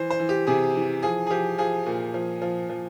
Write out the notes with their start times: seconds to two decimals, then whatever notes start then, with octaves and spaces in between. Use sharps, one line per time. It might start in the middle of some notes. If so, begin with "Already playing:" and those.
Already playing: E3 C5
0.10 C5
0.20 E3
0.29 G4
0.47 C3 G#4
0.75 E3
1.03 F3 G#4
1.27 G#4
1.30 F3 G4
1.58 F3 G#4
1.86 A#2
2.14 F3
2.42 F3
2.69 F3